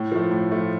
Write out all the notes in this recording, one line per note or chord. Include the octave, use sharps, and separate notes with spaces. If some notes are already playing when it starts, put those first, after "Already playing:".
Already playing: A2
F3 A3
A2
F3 A3